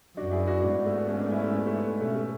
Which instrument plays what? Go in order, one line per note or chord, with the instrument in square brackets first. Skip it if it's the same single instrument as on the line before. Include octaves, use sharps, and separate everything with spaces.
[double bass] F#2 [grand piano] D4 F#4
[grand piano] E4 G#4
D4 F#4
[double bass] G#2 [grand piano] B3 D4
[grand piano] B3
A3
B3
A3 C#4
B3 D4
C#4 E4
A3 C#4
B3
A3
B3
B3
[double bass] B2 [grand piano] A3 C#4
[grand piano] A3